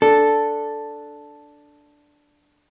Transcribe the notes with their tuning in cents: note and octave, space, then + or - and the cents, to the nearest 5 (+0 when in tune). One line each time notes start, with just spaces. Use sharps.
D4 +0 A4 +0